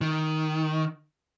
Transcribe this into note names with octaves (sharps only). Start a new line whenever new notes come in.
D#3